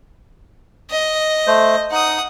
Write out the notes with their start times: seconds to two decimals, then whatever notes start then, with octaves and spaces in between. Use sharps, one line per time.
0.91 D#5
1.47 A3 C5
1.92 D#4 F#5 D#6